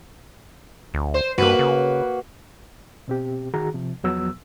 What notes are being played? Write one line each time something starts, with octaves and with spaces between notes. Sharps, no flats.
D2
C5
G2 A#3 F#4 B4
C#3
B2 C4 G4
D#3 F#4 G#4 A#5
C3 F3
E2 F3 F#3 B3 E6